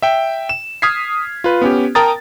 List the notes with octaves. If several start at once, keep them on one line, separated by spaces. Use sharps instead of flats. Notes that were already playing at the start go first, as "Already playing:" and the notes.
E5 G5
E7
D#6 F6 G#6 B6 C7
F4 B4
B3 C#4 G4
A#4 G5 A5 A#5 D#6 A6